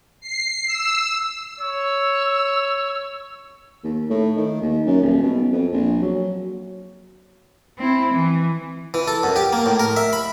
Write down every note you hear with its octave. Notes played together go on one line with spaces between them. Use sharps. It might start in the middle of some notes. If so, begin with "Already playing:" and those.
C7
E6
C#5 E6
D#2
A2
D#3
D#2
F#2
D#1
B2
F2
A#1
F#3
C4 E4
E3
E3
A4
F#2
G4
A#3
A2
A#4
E5
B5